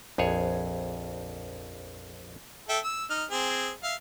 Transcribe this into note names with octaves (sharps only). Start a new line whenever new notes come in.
A#1 F2 G#4 C#5
A4 E5 G5
E6
D#4 F6
C4 G#4
E5 F5